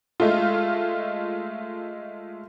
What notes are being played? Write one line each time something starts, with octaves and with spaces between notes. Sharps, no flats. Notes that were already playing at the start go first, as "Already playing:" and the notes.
G#3 A3 F4